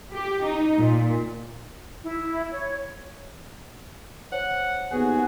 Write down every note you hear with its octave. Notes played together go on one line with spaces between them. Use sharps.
G4
D#4
A#2
E4
C#5
C5 C#5 F#5
D#2 B3 F#4 G#4 B4 G#5